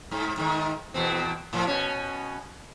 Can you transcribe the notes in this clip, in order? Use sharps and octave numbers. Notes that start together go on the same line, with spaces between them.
G#2
G#2 D#3
E2 B2 C4
A2 F3
B2 C#4